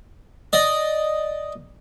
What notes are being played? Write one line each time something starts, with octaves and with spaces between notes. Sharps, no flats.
D5 D#5